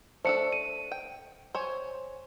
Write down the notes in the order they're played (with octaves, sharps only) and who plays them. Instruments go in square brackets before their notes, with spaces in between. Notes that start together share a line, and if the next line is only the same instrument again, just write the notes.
[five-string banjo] A3 D4 A4 [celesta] C5 C#7
[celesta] D#7
[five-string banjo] G5
C5 C#5 G#5